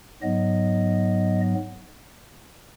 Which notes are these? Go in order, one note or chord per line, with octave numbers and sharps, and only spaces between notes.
G#2 F#3 B3 D#5